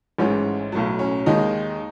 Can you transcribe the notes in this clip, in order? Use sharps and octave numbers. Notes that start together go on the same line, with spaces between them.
A1 G#2 E3 G#3 C#4
B1 A2 F#3
C#4
D#2 D#3 G#3 D#4